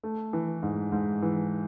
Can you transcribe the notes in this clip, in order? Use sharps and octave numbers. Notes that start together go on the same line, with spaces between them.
A3
E3
G#2
G#2
E3